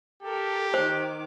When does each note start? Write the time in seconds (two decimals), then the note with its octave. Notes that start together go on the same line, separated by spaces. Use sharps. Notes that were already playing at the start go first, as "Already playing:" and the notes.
0.23 G4 A4 A#4
0.74 D#3 C5 D6